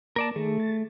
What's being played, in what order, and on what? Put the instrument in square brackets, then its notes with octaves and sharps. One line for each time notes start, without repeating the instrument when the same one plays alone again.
[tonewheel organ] A#3 [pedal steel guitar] A#4 D5 A5
[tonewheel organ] D#3 G#4 [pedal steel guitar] A3
[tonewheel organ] A6